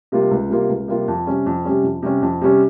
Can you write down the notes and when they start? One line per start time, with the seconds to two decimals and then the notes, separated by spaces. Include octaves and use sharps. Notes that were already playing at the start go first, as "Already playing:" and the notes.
0.12 C3 G3 A#3 F4
0.31 C#2
0.50 C3 G3 A#3 F4
0.69 C#2
0.88 C3 G3 A#3 F4
1.08 F2
1.27 C3 G3 C#4
1.46 F2
1.65 C3 G3 C#4
1.84 F2
2.03 C3 G3 C#4
2.22 F2
2.41 C3 G3 C#4